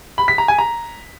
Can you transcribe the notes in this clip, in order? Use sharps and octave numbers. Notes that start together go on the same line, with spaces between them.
B5
B6
A#5
G#5
A#5